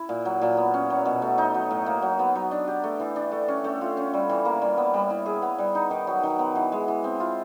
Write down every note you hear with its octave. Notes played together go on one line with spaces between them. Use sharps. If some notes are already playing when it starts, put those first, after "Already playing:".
Already playing: E4
A#2
F#3
A#2
B3
C#4
F#3
B2
A3
D#4
F#3
A2
A#3
F#3
B3
F#3
D4
G4
A3
E3
D4
A3
C#4
A3
F4
C#4
G3
E3
A#3
G3
B3
G3
E4
G#4
B3
G3
D#4
D#3
F#3
D#3
B3
E3
G#3
E3
C4
F4